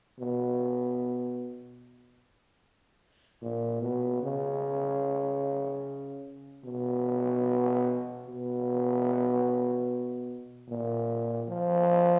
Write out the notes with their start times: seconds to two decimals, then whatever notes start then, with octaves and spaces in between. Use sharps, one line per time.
0.19 B2
3.42 A#2
3.82 B2
4.22 C#3
6.64 B2
8.26 B2
10.69 A#2
11.48 F3